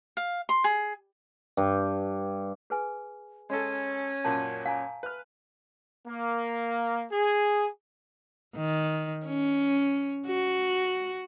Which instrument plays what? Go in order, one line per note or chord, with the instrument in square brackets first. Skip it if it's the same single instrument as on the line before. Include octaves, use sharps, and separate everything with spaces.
[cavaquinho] F5
C6
G#4
[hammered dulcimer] G2
[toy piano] G#4 B4 G#5
[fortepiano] G#3 A4 [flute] C#4
[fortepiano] F#2 A#2 [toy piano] A5
[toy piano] F5 G#5 A#5
[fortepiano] B4 F6
[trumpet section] A#3
G#4
[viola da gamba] D#3
C#4
F#4